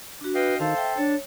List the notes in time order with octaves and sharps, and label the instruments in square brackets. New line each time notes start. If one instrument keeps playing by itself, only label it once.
[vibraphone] D4 F#4
[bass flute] B4 [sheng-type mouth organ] D#5 F5 G5
[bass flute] D#3 [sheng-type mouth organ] A4 C5 [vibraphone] F5
[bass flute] E5 [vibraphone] G5
[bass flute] D4 [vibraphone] C#5 [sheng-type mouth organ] A5